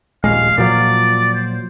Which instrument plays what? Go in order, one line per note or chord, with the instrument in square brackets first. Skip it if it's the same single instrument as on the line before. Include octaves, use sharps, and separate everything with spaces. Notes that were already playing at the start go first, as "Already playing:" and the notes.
[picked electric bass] D#1 A#1 G#3 [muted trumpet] F5
[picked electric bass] A#2 F3 F#3 [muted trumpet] D5
[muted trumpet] C5